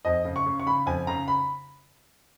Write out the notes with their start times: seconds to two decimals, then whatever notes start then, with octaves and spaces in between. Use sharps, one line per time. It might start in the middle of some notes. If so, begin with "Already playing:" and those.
0.05 F2 D#5
0.25 C#3
0.36 C#6
0.46 C#3
0.60 C#6
0.66 C#3 B5
0.86 F2 G#5
1.07 C#3 A#5
1.28 B5